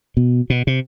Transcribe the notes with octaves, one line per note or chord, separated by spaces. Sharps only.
B2
B2
C3